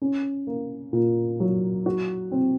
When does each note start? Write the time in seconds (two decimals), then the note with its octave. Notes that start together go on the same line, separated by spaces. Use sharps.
0.02 C#4
0.47 A#3
0.93 A#2
1.40 F#3
1.86 F#4
2.32 C4